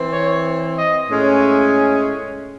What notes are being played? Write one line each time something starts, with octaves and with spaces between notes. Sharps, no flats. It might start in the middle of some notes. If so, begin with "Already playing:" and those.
Already playing: E3 C4
C#5
D#5
A2 G#3 C#4
E5